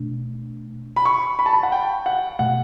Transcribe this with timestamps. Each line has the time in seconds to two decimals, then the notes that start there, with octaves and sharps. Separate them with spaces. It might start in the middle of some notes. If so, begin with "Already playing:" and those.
Already playing: B2 A3 D4
0.96 B5
1.05 C#6
1.39 B5
1.46 A5
1.53 B5
1.63 F#5
1.72 G5
2.06 F#5
2.39 B2 A3 F#5